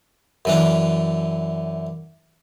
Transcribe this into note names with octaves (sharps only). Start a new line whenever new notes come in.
F#2 E3 D4